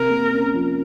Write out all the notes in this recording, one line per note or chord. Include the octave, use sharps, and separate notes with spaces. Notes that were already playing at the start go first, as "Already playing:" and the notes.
Already playing: C3 A#4
A#3
C#4
F3